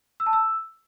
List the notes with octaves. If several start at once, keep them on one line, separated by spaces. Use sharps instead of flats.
E6
A5
E6